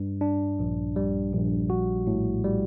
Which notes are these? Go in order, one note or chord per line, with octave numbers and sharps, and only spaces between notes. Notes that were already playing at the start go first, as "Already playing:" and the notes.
Already playing: G2
D4
A#1
G3
A#1
F#4
A2
G3